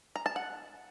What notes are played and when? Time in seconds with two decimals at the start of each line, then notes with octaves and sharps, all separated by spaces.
0.16 A#5
0.26 A5
0.36 F#5